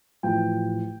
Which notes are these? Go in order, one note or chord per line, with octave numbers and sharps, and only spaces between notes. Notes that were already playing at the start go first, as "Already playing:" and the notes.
A1 A2 F3 G5